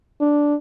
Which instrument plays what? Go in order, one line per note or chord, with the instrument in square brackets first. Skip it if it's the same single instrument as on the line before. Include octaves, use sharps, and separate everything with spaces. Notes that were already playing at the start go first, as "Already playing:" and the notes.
[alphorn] D4